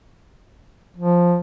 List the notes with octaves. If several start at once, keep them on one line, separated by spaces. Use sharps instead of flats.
F3